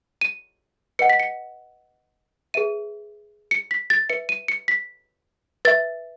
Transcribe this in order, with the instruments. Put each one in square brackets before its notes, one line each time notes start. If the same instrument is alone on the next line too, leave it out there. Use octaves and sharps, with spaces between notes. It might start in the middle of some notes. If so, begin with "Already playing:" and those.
[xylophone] D#7
B4 D#5 F#5 C#7
B6
C#7
G#4 B4 E5 D#7
C#7
B6
A6
B4 E5 C#7
D#7
C#7
B6
B4 E5 A6